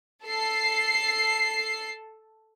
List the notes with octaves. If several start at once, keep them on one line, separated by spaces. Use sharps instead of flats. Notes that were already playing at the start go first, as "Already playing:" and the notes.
A4 C7